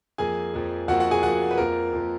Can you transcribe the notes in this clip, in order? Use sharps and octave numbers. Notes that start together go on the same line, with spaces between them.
F2 F3 A#3 G#4 G#5
F2 F3 A#3
F2 F3 A#3 F#4 F#5
F#4 F#5
G#4 G#5
F2 F3 A#3 F#4 F#5
B4
F2 F3 A#3 A#4
F2 F3 A#3